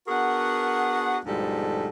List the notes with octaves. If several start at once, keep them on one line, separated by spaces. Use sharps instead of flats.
B3 D4 F#4 G#4 A#4 F#5
D2 G#2 B2 F3 G3 A4